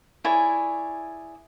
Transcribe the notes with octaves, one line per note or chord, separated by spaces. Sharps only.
E4 G#4 C#5 D5